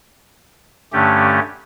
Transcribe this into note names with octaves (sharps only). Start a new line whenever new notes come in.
G2 D3 A3 C#4 G4